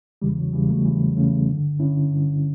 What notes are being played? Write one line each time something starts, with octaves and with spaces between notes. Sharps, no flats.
E2 C#3 E3 G3
F#3
E2 C#3 E3 G3
F#3 A3
E2 C#3 E3
E2 C#3 E3 A3 C#4
G2 D3
G2 D3 C#4 E4
G2 D3